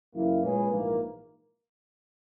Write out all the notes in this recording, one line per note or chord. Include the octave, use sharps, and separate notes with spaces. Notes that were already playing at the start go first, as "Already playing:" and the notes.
F#1 F#2 E3 A#3 E4
A#2 G#3 C#4 G#4 B4
A#1 G#2 E3 A#3